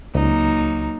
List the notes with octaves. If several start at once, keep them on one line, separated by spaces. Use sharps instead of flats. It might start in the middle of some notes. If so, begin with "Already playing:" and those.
C#2 F#3 A#3 D#4